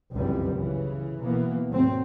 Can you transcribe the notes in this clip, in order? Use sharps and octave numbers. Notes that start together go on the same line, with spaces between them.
G1 C#2 F#2 C3 E3 G3
C#3 E3
B2 E3 A#3 B3
G#1 D#2 F#3 A3 C4